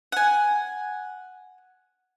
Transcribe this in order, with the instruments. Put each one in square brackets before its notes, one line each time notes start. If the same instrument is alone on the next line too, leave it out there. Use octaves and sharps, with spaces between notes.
[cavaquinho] F#5 G#5